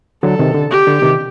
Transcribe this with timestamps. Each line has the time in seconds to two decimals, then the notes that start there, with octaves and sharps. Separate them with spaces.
0.23 D3 F#3 A4
0.39 C3 D#3
0.54 D3
0.70 G4
0.87 D3
1.02 C3 D#3